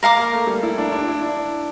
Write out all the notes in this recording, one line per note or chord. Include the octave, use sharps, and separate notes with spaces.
A#4 F5 A#5 D6
A#3
A3
G3
E4
D4
D4
E4
D4